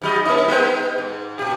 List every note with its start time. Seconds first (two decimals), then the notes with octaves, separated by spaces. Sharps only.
0.02 G#2 F#3 D#5
0.25 A#3 D#4
0.48 G3 B3 D#4
0.98 G#2
1.39 A#2 G4